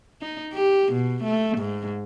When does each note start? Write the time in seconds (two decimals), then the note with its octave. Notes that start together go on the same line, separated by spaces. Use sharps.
0.21 D#4
0.53 G4
0.92 B2
1.24 A3
1.58 G#2